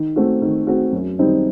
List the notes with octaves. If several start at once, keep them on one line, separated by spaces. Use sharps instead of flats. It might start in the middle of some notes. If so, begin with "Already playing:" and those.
Already playing: D#3
A3 C4 F#4
D#3
A3 C4 F#4
F#2
D#3 G3 C4 D#4